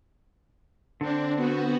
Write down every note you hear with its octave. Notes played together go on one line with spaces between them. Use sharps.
D3 C4 D4
B3 F#4